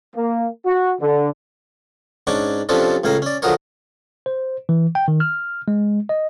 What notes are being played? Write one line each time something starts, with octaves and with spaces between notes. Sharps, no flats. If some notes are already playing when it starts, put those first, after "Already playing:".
A#3
F#4
D3
G#2 C#4 D4 C#6 D6
C3 F3 C#4 D4 F4 A4
C#2 A2 C#4 F5 A#5
C#4 D5
D3 F3 F#4 G#4 A#4 C#5
C5
E3
G5
D#3
F6
G#3
D#5